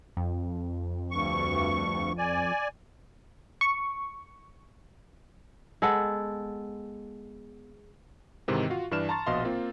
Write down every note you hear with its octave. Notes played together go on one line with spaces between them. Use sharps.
F2
D2 G2 C#6
D5 G#5
C#6
G#3 B3 A4 F#5
G#2 C3 D#3 E3 C4
F4 F#4 F5
G2 E3 D4 F6 E7
A5 A#5 C6 C#6 A6
A#1 B2 D#5 F5 C6
A#3 C4 F4